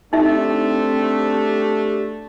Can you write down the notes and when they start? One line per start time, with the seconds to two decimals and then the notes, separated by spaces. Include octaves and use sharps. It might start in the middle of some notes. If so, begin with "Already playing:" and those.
0.13 A3 C4 D4 D#4 G4 E5